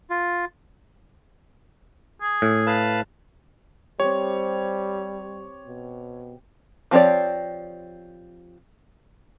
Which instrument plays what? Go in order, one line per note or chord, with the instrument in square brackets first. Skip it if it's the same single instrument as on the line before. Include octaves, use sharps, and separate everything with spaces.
[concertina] F4
[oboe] G#4
[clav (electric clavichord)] A2
[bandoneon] B4 F5 A5
[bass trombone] G3 [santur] C4 G4 [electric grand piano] C#5
[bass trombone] B2
[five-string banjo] F3 C4 G4 C#5 D5